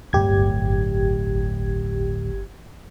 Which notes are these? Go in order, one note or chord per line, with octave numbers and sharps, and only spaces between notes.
D1 G1 G4 G#6